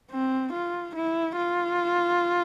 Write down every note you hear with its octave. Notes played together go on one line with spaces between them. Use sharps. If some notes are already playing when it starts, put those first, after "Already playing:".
C4
F4
E4
F4